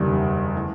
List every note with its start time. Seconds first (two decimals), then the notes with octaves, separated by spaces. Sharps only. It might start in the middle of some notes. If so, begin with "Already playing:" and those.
Already playing: F#1 E2 D#3 G3
0.54 E3 A3